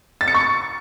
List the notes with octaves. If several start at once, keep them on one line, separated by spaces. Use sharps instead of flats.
A6
C#7
C#6